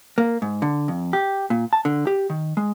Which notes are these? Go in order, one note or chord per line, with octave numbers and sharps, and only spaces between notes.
A#3
G#2
D3
F2
G4
A#2
A5
D3
G4
D#3
G#3